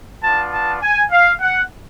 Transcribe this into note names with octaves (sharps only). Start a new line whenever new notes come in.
B3 D4 F4 A5
A5
G#5
F5
F#5